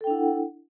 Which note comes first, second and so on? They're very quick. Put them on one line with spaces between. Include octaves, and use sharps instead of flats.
A4 G5 D4 E4 F#5